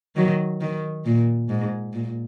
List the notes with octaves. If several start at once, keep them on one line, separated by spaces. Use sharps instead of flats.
D#3 F#3
D#3
A#2
G#2
A#2